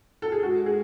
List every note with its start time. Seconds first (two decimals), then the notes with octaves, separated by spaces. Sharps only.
0.22 A4
0.32 G#4
0.43 G#3 F#4
0.66 G#4